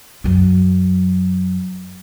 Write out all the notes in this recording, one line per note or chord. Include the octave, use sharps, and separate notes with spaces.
F#2 F#3